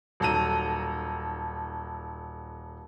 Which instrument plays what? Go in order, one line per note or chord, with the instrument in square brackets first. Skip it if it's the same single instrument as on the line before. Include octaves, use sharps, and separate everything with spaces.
[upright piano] D#1 F#3 A4 A#5 D#7